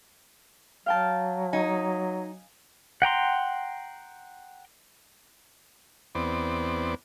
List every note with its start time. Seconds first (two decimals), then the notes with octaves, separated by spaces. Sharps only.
0.86 F#3 F5 G5 A5
1.53 D#4 G#5
3.02 F#5 G5 A#5 C6
6.15 E2 B3 C4 D5